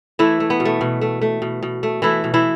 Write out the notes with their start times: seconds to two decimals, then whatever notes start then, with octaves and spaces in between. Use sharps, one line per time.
0.19 E3 A3 E4
0.40 A3
0.50 B3
0.60 B2
0.65 A3
0.81 B2
1.01 A3
1.22 A3
1.42 B2
1.63 B2
1.83 A3
2.02 E3 A3 E4
2.24 B2
2.34 E3 E4